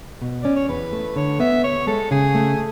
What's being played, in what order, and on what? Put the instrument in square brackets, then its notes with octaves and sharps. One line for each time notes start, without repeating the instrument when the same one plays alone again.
[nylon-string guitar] B2
[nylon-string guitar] C#4 [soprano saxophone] D5
[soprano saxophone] C#5
[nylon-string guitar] E2 [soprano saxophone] B4
[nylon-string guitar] A3
[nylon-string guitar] D3 [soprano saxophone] C#5
[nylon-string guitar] B3 [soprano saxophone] E5
[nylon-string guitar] D2 [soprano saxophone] C#5
[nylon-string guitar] G#3 [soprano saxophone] A4
[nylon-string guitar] C#3 [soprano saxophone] G#4
[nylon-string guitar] A3